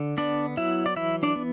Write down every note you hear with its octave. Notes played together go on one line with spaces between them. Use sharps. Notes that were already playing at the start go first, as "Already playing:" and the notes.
Already playing: D3
B3 D4 D5
F#3 E4 E5
D5
E3 E4 E5
D4 D5
B3